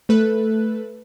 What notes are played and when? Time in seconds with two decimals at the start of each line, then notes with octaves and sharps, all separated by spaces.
0.09 A3 A4 B4 F#6